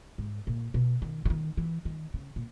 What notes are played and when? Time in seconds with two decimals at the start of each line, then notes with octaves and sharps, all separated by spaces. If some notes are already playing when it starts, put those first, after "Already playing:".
0.18 G#2
0.47 A#2
0.74 B2
1.02 D#3
1.25 C#3
1.30 D#3
1.57 E3
1.85 D#3
2.14 C#3
2.36 A#2